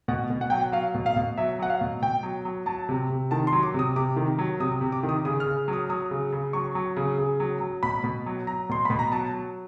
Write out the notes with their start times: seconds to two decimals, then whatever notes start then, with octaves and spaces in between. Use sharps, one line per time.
0.08 B2 F#5
0.30 B2
0.41 F#5
0.50 F#3 G5
0.60 F#5
0.72 F#3 F5
0.95 B2
1.06 F5
1.16 B2
1.37 F#3 E5
1.59 F#3 F#5
1.70 F5
1.81 B2
2.02 B2 G5
2.23 F#3
2.45 F#3
2.66 F#3 A5
2.89 C3
3.10 C3
3.31 D#3 A5
3.47 C6
3.52 F#3
3.63 D6
3.74 C3
3.79 D#6
3.96 C3 D6
4.17 D#3
4.38 F#3
4.60 C3 D#6
4.81 C3
4.92 D6
5.03 D#3
5.09 D#6
5.25 C#3 D#6
5.40 F6
5.46 C#3
5.68 F#3
5.73 D#6
5.90 F#3 D#6
6.11 C#3
6.32 C#3
6.53 F#3 C#6
6.75 F#3
6.96 C#3
7.18 C#3
7.40 F#3
7.61 F#3
7.83 B2 B5
8.04 B2
8.26 F#3
8.47 F#3 A#5
8.69 B2 C6
8.85 B2 B5
8.99 A#5
9.12 F#3 A5
9.34 F#3